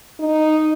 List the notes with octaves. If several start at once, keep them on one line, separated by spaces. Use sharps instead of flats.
D#4